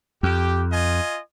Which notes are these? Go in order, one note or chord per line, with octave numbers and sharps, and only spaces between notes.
F2 G4
F4 D#5 G#5